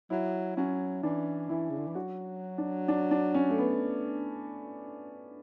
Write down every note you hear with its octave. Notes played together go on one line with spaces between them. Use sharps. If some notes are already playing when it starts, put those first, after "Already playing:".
F#3 E4
F#3 C#4
E3 D4
E3 E4
C#3
D3
E3
F#3 F#4
D4
D4
D4
C#4
A3
B3